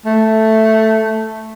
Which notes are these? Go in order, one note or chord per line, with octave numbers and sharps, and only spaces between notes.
A3